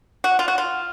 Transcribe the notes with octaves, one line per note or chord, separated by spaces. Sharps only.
F#4
F4
F#4
F4